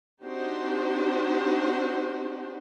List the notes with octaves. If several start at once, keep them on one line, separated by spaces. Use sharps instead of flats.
C4 D4 D#4 F#4 G4 C5